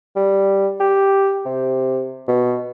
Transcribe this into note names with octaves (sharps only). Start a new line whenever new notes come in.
G3
G4
C3
B2